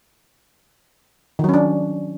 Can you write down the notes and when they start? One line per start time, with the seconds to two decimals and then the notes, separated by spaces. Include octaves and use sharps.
1.39 D#3
1.44 F#3
1.49 C#4
1.54 D4